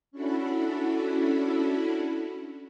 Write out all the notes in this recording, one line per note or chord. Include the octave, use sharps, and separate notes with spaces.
C#4 D4 E4 F#4 A4 B5